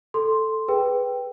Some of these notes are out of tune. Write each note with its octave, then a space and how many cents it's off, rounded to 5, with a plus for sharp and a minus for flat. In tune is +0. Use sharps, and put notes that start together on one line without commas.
A4 +0 C6 +0
G#4 +0 B4 +0 G5 +0